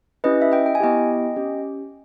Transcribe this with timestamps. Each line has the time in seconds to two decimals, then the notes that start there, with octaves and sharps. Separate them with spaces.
0.24 C#4 E4 G4 B4 D#5
0.42 E5
0.52 D#5 G5
0.66 G5
0.75 G#5
0.80 B3 E4 G4 D#5 G5
1.36 C#4 G4